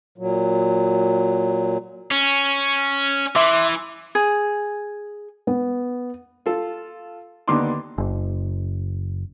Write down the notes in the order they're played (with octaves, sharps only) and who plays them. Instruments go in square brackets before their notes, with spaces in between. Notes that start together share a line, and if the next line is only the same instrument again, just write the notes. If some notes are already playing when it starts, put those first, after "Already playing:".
[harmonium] A#2 F#3
[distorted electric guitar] C#4
[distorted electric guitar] E3 [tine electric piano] E5 C6 D6
[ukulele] G#4
[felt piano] B3
[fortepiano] F4 A4
D#2 D3 B3 D#4 C6 D6
[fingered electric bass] F#1